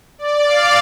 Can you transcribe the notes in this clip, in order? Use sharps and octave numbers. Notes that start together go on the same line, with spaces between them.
D5
F5